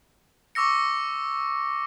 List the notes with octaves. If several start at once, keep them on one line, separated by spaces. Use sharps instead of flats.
C#6 D6 E6 A#6 C#7